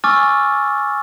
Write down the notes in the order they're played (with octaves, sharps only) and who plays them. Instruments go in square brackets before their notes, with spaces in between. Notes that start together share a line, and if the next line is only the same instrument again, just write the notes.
[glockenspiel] G#5 C#6 D6 E6 F6 A6